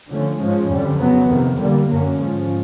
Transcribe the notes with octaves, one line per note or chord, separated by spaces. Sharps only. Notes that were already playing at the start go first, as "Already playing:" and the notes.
D3 F3 A3 C#4
G#2 F3 G#3 C#4
F2 D3 G3
C#3 F#3 B3
F2 C3 D#3
D3 G3 A#3
F#2 D3 F#3 A#3 C#4
G#2 F3 G#3 C#4